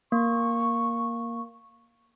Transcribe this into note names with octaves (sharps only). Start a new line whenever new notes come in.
A#3 C#6